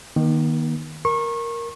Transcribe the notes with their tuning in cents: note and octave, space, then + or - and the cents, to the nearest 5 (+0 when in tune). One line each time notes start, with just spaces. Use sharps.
D#3 +0 A#3 +40
A#4 +0 C#6 -30